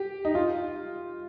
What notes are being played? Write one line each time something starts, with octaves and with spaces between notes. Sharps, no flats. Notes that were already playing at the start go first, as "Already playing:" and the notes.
Already playing: G4
D#4
F4